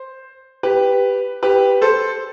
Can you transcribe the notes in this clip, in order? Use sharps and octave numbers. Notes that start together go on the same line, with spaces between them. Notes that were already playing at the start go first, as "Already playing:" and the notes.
Already playing: C5
G4 B4
G4 B4
A4 C5